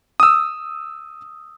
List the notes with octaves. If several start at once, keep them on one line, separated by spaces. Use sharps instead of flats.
D#6 E6